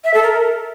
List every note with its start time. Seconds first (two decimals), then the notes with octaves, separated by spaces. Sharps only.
0.04 E5
0.14 A4
0.23 A#4